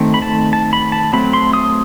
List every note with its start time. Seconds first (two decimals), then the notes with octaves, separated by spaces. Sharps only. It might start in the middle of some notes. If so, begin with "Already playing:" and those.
Already playing: D#3 A3 C4
0.14 B5
0.22 A5
0.53 A5
0.73 B5
0.92 A5
1.13 F#3 A3 C4 B5
1.33 C6
1.53 D#6